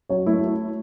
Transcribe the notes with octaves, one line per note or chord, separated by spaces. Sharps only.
F#3 C#5
A3 E4